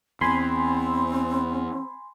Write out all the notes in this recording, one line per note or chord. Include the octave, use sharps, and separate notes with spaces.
E2 C4 G#5 B5 C6